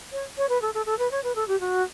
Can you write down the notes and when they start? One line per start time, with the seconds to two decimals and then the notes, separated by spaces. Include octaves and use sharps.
0.12 C#5
0.38 C#5
0.49 B4
0.62 A4
0.74 A4
0.86 A4
0.99 B4
1.11 C#5
1.24 B4
1.35 A4
1.48 G4
1.60 F#4